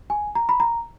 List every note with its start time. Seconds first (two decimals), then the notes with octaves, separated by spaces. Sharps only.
0.10 G#5
0.35 A#5
0.49 B5
0.60 A#5